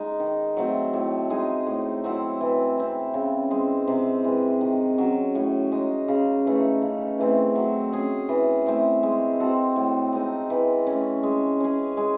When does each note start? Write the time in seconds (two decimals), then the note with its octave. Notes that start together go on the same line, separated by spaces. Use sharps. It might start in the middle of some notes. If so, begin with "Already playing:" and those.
Already playing: G#3 D#4
0.20 D#3
0.57 F#3 A3 C4
0.93 A2
1.30 G#3 D#4 G#4
1.67 A2
2.04 F#3 C4 E4
2.41 E3
2.77 C4 E4
3.14 C#3
3.51 G#3 C4
3.87 C3
4.24 E3 G#3
4.61 D#3
4.98 F#3 C#4
5.35 A2
5.72 G#3 D#4
6.08 C#3
6.45 E3 A3 D#4
6.82 C#3
7.19 E3 A3 C4
7.55 F#3
7.92 C#4 G#4
8.29 E3
8.66 A3 C4 E4
9.03 G#3
9.40 C4 F#4 A4
9.76 A2
10.13 G#3 C4 D#4
10.50 E3
10.87 A3 C#4
11.23 G#3
11.60 C#4 G#4
11.97 G#3